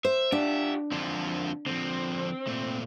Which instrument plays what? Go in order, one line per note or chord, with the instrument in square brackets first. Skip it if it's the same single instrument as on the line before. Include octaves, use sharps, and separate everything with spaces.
[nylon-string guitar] C5 [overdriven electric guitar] E5
[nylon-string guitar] D4 [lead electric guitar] F4 G4
[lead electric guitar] F2 D3 [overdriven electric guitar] C4 F4
[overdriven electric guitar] D3 F3 [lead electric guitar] C4
[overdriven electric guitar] A#2 A3